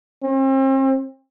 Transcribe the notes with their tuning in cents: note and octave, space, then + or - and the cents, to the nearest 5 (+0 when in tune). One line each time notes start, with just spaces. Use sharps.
C4 +40